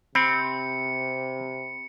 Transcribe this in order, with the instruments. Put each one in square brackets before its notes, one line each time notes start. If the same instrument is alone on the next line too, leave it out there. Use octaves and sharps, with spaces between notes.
[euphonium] C3 [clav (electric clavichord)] C4 [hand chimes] B5 [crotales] C#7